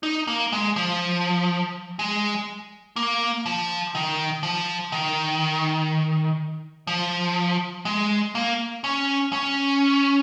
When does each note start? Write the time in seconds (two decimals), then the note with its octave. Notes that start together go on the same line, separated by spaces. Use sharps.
0.03 D#4
0.27 A#3
0.52 G#3
0.76 F3
1.99 G#3
2.96 A#3
3.46 F3
3.95 D#3
4.43 F3
4.92 D#3
6.87 F3
7.85 G#3
8.35 A#3
8.84 C#4
9.33 C#4